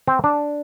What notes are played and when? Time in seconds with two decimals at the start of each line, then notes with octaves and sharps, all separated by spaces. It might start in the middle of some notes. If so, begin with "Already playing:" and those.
0.08 C4
0.24 D4